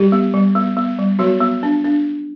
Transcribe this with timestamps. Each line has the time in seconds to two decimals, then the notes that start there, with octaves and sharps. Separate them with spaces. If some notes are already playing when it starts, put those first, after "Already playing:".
Already playing: G3 G4
0.12 B3
0.34 G3
0.55 B3
0.77 B3
0.98 G3
1.19 F#3 B3 F#4
1.40 B3
1.63 D4
1.84 D4